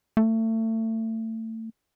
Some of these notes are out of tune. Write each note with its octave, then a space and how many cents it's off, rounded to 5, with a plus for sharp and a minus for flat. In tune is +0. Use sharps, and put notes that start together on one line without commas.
A3 +30